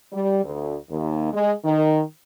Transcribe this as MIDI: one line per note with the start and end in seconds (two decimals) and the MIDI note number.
0.12 0.43 55
0.44 0.76 38
0.90 1.29 39
1.32 1.52 56
1.64 2.02 51